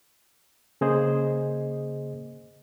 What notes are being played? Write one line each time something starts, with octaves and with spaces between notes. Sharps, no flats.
C#3 A#3 G#4 C5 D#5